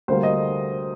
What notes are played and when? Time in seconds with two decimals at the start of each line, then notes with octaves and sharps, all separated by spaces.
0.08 D2 D3 G3 A#3 C5
0.23 D#5